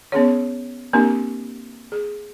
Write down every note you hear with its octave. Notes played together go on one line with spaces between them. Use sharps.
B3 C#4 G#4 C#5
A#3 C4 D4 G4 A#4
G#4